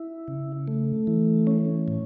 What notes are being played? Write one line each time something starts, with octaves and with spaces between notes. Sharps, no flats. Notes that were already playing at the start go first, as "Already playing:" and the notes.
Already playing: E4
C#3
A3
E3
C#4
A2